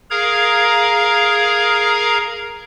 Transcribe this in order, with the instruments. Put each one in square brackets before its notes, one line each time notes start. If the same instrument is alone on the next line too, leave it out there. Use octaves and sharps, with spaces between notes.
[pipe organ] G#4 A#4 F5 A#5 G#6